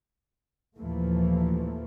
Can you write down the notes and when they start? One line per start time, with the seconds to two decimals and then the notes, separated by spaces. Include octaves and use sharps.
0.76 D#2 A#2 E3 F3 A3 A#3